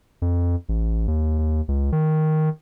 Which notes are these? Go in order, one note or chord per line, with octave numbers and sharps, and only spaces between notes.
F2
A1
D#2
D#2
C#2
D#3